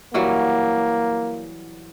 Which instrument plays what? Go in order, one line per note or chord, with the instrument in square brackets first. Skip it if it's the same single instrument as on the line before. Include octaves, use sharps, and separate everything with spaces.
[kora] E3 F#3 G3 [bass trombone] A#3